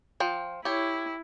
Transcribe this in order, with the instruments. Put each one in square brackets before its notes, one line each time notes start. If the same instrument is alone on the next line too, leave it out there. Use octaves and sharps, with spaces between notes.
[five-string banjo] F3 G5
[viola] E4 [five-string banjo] G4 C#5